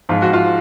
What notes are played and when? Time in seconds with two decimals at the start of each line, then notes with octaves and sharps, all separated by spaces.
0.09 G#2 F3 G#3 F4
0.22 F#4
0.33 F4